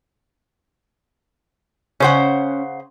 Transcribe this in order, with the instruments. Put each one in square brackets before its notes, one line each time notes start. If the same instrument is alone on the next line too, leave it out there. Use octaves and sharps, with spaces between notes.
[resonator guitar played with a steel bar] C#3 C5 F#5 [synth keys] C#4